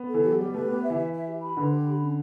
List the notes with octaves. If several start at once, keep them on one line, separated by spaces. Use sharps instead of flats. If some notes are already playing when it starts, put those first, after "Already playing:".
Already playing: B3
E3 A4
F#3 G4
G3 G4
A3 B4
B3 G4
E5
E3
E5
E5
G4
B5
D3 B4
G4
B5
C#4